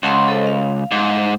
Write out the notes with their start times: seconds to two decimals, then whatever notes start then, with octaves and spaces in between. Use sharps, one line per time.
0.03 C#2 F#5 A5 C6
0.28 A4 C5 D#5
0.47 F5
0.92 G#2